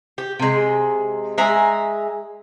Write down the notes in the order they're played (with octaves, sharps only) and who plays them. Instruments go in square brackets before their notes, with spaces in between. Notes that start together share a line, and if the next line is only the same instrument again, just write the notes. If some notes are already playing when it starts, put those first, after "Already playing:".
[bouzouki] G4
C3 G#3
G#3 E5 G#5 A#5